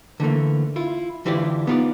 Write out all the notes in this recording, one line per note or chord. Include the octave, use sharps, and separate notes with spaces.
D3 E3 A3 A#3
E4 F4
D3 E3 E4 F4 G4 D5
B3 D#4 F4 B4 D5